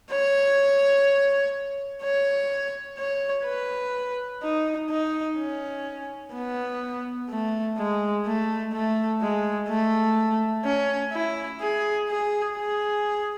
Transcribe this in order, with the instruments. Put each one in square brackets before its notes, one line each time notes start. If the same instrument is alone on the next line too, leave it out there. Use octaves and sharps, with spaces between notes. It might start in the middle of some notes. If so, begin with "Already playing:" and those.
[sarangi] C#5
C#5
C#5
B4
D#4
D#4
C#4
B3
A3
G#3
A3
A3
G#3
A3
C#4
E4
G#4
G#4
G#4